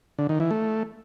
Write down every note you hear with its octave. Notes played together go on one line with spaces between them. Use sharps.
D3
D#3
E3
A3